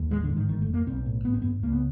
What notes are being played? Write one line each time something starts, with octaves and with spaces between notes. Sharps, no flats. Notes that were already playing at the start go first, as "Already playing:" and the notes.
Already playing: D#2
A1 G#3
D3
G#2
D#3
G1 D#3
A3
F2
A#3
B1 C4
A2
G#1 B3
C4
G2 B3
C#2 A#3
B3